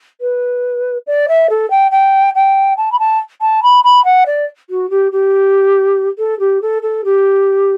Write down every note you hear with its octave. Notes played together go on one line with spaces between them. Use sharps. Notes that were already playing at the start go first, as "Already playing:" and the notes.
B4
D5
E5
A4
G5
G5
G5
A5
B5
A5
A5
B5
B5
F#5
D5
F#4
G4
G4
A4
G4
A4
A4
G4